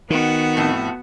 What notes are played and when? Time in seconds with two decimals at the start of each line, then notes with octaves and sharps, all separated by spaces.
0.10 D#3 B3 F#4
0.57 F2 A2